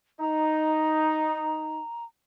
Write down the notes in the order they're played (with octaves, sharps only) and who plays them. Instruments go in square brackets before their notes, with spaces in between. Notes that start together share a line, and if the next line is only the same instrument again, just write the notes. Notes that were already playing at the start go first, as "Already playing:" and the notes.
[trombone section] D#4 [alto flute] A#5